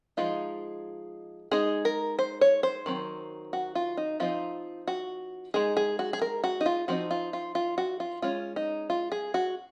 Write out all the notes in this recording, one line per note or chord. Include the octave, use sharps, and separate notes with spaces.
F3 G#3 D#4 F4
G#3 D#4 G#4
A#4
C5
C#5
C5
D#3 F#3 C4
F#4
F4
D#4
F3 C4 D#4 F4
F#4
G#3 D#4 G#4
G#4
F#4
G#4
A#4
F#4
D#4
F4
F3 C4 D#4 F#4
F4
F4
F4
F#4
F4
G#3 C#4 F4
D#4
F4
G#4
F#4